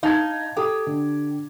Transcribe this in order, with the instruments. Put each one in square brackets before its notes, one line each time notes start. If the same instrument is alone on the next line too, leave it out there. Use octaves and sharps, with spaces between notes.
[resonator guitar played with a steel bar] D#4 [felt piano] F5 A5 G#6
[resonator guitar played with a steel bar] G4 [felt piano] A4 D#6
[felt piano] D3